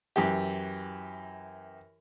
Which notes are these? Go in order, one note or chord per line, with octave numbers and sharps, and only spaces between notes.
F#2 E3 G4